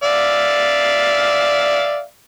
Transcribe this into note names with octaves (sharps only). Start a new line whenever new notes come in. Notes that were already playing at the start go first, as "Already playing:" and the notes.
D5 E5 F5